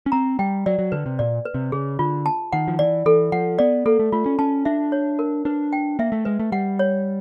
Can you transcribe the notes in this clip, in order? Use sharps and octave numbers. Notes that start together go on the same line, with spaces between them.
C#4
C4 A#5
G3 G5
F#3 D5
F#3
D3 B4
C3
A#2 D5
B4
C3
C#3 G#4
D3 F4
A5
D#3 F#5
F3
E3 D5
E3 A4
F3 F#5
B3 D5
A#3 A4
A3
A3 F4
C#4
C#4 A5
D4 E5
C#5
A#4
D4 B4
G5
A#3 E5
A3
G#3 B4
A3
G3 F#5
C#5